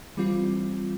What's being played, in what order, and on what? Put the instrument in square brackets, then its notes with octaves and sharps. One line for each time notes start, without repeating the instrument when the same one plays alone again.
[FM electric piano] E3 G3 C4 F4